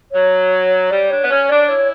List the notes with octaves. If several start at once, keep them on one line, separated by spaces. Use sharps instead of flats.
F#3 C#5
G3 D5
D4 C#5
B3
C#4 C#5
D4 D5
E4 C#5